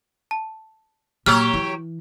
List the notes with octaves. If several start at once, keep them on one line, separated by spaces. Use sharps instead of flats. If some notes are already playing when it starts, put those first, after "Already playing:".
A5
A#2 F#3 G4 C#5 F6
E3